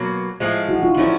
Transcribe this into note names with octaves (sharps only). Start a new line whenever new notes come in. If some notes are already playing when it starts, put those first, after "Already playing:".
Already playing: B2 F#3 A#3
A2 F3 G#3
E4 F#4
D#4 F4
A2 F3 A3 C#4 D4 E4